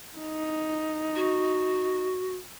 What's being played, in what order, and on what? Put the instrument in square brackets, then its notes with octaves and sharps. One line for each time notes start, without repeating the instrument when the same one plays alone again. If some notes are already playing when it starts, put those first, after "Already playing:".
[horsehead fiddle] D#4
[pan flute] F#4